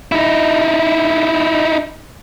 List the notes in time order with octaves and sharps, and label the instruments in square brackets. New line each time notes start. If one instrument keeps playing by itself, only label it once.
[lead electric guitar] D#4 E4